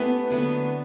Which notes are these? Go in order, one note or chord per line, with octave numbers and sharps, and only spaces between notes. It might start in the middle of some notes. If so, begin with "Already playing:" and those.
Already playing: A3 B3 C#4 E4 G4 B4
D3 F#3 A3 B3